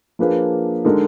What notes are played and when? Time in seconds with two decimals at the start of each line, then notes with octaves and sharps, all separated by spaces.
0.19 F3 A#3 D4 G#4 B4
0.85 D3 G#3 D#4 A#4